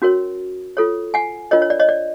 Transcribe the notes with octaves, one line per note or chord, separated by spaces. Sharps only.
C#4 F#4 A#4 C#5
F4 A4 C#5
F#5 G#5
D4 F4 A#4 C#5 D#5
C#5
D5
C#5 D#5
D5